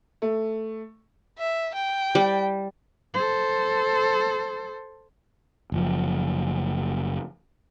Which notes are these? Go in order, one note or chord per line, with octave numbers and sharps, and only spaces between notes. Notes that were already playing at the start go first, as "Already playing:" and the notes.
A3
E5
G5
G3
A4 C5
F#1 F3